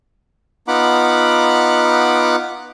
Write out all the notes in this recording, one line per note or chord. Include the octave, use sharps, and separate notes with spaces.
B3 D#4 F4 F#5 B5 D6